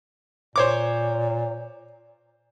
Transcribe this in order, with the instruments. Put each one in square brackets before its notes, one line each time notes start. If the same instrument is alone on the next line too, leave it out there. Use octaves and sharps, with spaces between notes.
[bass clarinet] A#2 [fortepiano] C5 C#5 D6